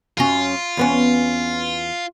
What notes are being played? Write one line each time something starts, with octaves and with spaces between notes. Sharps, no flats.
F#2 C#4 F4
E2 B3 C#4